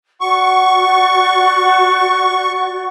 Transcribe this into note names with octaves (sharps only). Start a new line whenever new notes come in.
F#4 D5 F#5 C#6